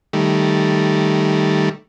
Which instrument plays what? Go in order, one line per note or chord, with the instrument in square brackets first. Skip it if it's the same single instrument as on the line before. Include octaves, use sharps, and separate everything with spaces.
[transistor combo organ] D#3 G3 A3